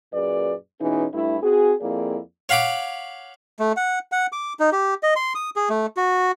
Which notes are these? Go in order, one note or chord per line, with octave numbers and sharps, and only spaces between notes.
F#2 A#2 G#4 B4 D5
B2 E3 C#4 D#4 G#4
G2 A3 E4
C4 F#4 G#4
F2 A#3 E4 G#4 D5
C#5 F5 F#5 B5 D6
A3
F#5
F#5
D6
D#4
G4
D#5
C6
D#6
G#4
A3
F#4